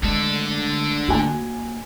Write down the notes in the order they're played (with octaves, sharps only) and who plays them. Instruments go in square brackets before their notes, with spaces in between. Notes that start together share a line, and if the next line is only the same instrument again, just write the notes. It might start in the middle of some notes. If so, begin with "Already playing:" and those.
[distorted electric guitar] D3 A4 [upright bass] G#3 A3
[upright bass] A#3 [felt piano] F#4 G#5